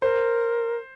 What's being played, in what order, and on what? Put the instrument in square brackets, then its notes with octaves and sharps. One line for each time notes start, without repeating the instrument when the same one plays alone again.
[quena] A#4 [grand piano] C5